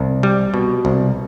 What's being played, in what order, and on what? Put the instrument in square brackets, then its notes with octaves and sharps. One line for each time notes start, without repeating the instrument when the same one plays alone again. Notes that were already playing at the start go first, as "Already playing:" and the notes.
Already playing: [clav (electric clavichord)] C2
G3
B2
C2